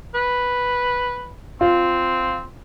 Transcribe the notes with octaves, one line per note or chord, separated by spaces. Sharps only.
B4
C4 F4